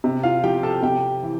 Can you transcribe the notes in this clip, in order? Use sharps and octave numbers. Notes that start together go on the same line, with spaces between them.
C3
F4 F5
F3 G4 G5
A4 A5
C3 G4 G5
E3